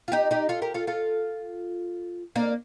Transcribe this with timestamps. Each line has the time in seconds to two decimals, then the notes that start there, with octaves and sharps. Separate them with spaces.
0.08 F4
0.12 D#4 G4
0.31 D#4 G4
0.49 F4 A4
0.62 G4 A#4
0.74 F4 A4
0.87 F4 A4
2.36 A#3 D4